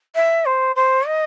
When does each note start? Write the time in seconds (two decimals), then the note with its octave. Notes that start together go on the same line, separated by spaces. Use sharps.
0.15 E5
0.45 C5
0.76 C5
1.06 D#5